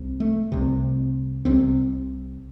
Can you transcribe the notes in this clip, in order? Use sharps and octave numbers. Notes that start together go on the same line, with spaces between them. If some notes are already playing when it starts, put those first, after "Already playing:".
Already playing: C2 C3
A3
C2 C3
C2 C3 C4